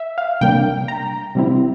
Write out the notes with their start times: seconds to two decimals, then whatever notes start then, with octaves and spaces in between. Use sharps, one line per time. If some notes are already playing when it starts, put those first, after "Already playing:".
Already playing: E5
0.18 F5
0.41 C3 G3 A#3 D4 G5
0.88 A#5
1.35 C3 G3 C4 E4